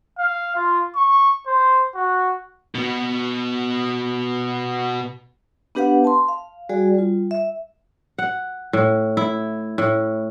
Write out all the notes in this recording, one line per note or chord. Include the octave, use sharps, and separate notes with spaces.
F5
F4
C#6
C5
F#4
B2 B3
B3 D4 G4 B4 F5 F#5
A5 C6
F5
G3 F#4 G#4 D5 G#5
G3 F4
E5
F#5
A2
E4
A2